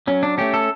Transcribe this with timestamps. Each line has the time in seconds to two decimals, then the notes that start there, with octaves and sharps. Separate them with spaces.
0.07 F#3 C#4
0.23 D4
0.38 A3 C#4 G4
0.54 A4